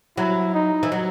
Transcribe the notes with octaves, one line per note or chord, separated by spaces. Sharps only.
F#3 E4
D#4
E3
F#3